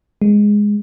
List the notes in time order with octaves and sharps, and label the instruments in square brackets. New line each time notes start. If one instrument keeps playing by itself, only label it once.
[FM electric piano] G#3